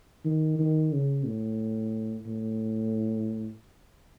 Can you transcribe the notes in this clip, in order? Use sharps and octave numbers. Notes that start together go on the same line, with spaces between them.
D#3
D#3
C#3
A2
A2